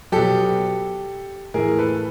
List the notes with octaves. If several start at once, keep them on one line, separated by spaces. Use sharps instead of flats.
B2 F#3 G4 A4
A2 E3 G#4 A#4
A4 B4